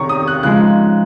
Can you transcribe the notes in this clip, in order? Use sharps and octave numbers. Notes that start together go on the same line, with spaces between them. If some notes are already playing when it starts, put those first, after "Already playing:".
Already playing: C3 D#3 C#4 A#5 C#6
D#6
F#6
C#3 F3 G#3 D#4 F#6